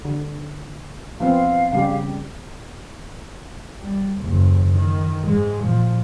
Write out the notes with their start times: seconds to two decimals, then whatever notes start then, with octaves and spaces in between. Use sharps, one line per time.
0.05 D3
1.20 F3 B3 C4 F5
1.72 C#3 G3 G4
3.80 G3
4.19 F#1 D#2
4.71 D#3
5.27 G#2 G#3
5.62 A#2 F3